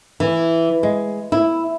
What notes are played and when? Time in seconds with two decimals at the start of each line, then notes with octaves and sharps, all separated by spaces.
0.20 E3
0.83 G#3
1.32 E4